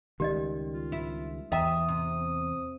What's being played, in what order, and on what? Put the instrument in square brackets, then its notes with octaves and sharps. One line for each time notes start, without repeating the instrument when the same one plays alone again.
[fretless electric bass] C#2 D#3 G3 [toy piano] G4 D5 D#5
[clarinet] F4
[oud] E4
[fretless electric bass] E2 [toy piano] D#5 G5 A#5 [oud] E5 [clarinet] D#6
[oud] C3